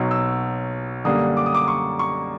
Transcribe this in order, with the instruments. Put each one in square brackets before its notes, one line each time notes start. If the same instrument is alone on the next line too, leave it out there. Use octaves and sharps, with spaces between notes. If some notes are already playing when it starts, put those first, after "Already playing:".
Already playing: [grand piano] B1 B2 F#3
E6
F#2 D3 G3 A#3 D#6
D6
D#6
D6
C#6
C#6